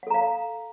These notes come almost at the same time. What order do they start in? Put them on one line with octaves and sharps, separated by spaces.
F#5 A4 A#5 F5